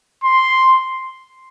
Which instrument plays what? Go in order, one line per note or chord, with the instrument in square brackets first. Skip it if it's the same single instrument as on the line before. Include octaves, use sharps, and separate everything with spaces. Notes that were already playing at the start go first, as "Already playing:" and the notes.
[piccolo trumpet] C6